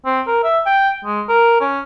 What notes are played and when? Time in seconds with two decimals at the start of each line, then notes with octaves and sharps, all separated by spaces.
0.06 C4
0.27 A#4
0.44 E5
0.66 G5
1.05 G#3
1.29 A#4
1.61 C#4